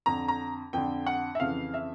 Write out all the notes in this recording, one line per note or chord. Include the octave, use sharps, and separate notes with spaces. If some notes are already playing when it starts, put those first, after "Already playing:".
F2 D3 A#5
A#5
F2 D3 G5
F#5
E5
F2 C#3 E3 F5
E5